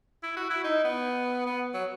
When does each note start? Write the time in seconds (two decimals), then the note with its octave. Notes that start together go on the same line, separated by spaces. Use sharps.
0.23 E4
0.37 F#4
0.50 E4
0.64 D#4
0.84 B3
1.46 B3
1.74 F#3